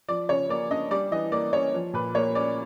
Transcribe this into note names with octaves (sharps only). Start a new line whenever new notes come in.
F3 D5
C#3 C#5
A#3 D5
D4 D#5
G3 D5
E3 D#5
A#3 D5
C#4 C#5
F3
A#2 B4
A#3 C#5
C#4 D5